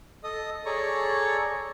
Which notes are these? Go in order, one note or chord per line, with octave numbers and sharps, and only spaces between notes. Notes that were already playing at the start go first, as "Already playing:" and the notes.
A4 D#5 D#6
G#4 A4 C#5 D5 A#5 C#6